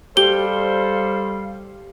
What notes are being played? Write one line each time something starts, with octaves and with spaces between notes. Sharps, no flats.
G3 G4 A4 C5 F5 G7